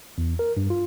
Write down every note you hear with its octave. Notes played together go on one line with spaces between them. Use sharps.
E2
A#4
G2
F4